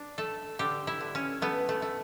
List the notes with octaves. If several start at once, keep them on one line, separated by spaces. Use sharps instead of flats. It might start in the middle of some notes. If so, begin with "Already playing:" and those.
Already playing: D4
A3 A4
D3 G4
E4
D3
C#4
A3 B3
A3
A3